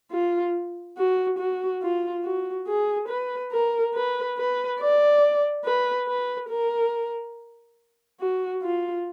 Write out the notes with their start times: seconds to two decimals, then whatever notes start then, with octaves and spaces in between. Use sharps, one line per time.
0.11 F4
0.97 F#4
1.39 F#4
1.82 F4
2.24 F#4
2.67 G#4
3.09 B4
3.52 A#4
3.94 B4
4.37 B4
4.79 D5
5.65 B4
6.08 B4
6.49 A#4
8.20 F#4
8.63 F4